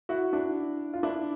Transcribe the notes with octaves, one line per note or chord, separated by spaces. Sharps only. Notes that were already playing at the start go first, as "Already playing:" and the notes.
E4 F#4
D4 E4
F4
D4 E4